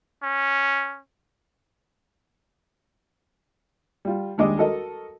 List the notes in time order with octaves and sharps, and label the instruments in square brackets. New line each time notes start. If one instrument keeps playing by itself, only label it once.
[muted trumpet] C#4
[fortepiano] G3 F4
D#2 G3 G#3 D4 D#5 D6
F#4 A4 A#4 D#5